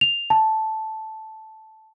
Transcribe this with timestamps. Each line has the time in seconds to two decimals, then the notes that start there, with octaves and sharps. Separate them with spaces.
0.01 F7
0.30 A5